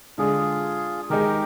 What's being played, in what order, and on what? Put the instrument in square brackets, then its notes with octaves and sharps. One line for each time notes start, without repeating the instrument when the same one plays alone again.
[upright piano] D3 G#3 D4 [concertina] F4 G#4
[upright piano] D#3 G#3 D#4 [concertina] G4 A#4